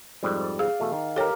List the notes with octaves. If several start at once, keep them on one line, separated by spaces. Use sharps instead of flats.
F2 G#2 G3
D5
G#4 F5
B2 E3 A3
D#3
G4 A4 A#4 C#5